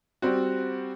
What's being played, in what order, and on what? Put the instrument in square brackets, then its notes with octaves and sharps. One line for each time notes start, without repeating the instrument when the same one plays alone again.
[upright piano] G3 C4 F#4